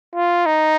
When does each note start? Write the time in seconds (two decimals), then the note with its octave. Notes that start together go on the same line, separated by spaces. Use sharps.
0.15 F4
0.46 D#4